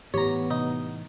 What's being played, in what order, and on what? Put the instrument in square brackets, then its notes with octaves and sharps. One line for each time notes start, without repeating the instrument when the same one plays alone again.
[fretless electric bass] A2 E3 [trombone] B3 [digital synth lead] G4 [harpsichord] C#5 A#5
[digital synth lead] C3 [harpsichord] D#4